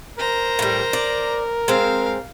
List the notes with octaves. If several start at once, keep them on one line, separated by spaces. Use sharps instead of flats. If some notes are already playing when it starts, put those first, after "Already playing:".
A#4 C5 A#5
A2 G3
D5
G#3 C4 F5